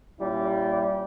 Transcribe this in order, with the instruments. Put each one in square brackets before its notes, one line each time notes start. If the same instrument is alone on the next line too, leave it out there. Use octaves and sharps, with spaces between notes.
[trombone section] A#2 G3 C#4 E4